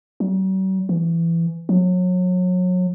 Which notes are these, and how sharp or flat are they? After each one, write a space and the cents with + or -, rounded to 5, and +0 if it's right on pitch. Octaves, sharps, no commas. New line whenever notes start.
F#3 +45
E3 +20
F#3 -30